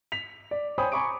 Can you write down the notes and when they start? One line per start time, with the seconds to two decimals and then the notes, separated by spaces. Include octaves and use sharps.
0.12 B6 F7
0.51 D5
0.78 C5 C#5 G5 G#5 B5 D#6
0.92 G#5 A#5 B5 C#6 D6 D7